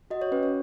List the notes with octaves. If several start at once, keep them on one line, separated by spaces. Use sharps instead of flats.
F#4 D#5
C#5
C#4 B4
C#5